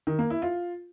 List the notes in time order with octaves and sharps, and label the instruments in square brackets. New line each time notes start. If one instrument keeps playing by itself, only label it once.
[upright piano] D#3
A#3
E4
F4